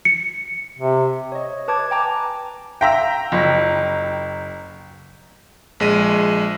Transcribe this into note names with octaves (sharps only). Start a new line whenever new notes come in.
C#7
C3
C#5 D#5
B4 A5 D6 G#6
G5 G#5 A#5 D6
E5 F5 G5 A#5 C6 E6
F#1 F4
A#1 G#3 D#7